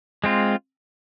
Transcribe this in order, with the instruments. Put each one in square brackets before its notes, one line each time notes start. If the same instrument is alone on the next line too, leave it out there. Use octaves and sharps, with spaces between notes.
[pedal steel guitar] G#3 C4 F4